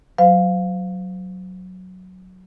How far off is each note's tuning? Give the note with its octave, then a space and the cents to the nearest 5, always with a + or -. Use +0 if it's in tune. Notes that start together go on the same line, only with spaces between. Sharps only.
F#3 +0 C5 -40 F5 +0